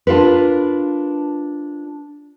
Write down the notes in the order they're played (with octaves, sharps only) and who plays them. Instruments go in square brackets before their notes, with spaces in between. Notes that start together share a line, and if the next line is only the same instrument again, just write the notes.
[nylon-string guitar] D4 F4 A#4 B4